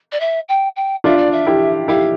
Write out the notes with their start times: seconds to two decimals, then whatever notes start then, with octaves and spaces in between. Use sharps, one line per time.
0.12 D5
0.20 E5
0.48 G5
0.76 G5
1.04 D4 F4 E5
1.17 D5
1.32 E5
1.46 E4 G4
1.88 E4 G4 F5